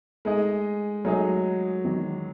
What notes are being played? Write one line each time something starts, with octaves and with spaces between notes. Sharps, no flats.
G#3 A3 D#4 G#4 D#5
F#3 A3 D#4 G#4 D#5
E2 D#3 F#3